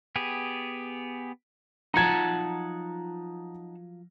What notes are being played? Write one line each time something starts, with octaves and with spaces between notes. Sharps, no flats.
B3 G4 G#4
F3 F#3 D#4 F4 F#5 A5 A#5 G#6